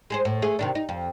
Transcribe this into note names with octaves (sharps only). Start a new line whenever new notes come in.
G#3 G#4 C5
A2
A3 G#4
C3 D#3 D4
D#4
F2